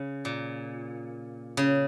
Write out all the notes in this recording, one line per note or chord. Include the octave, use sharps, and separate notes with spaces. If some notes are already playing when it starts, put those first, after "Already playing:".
Already playing: C#3
A#2
C#3